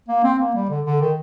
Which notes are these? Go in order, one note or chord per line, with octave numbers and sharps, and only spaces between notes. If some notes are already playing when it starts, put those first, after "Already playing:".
A#3
C4
A#3
G3
D3
D3
D#3